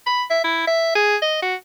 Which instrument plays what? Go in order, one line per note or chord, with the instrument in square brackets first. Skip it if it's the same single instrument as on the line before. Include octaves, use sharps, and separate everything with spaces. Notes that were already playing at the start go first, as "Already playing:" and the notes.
[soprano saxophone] B5
E5
E4
E5
G#4
D#5
F#4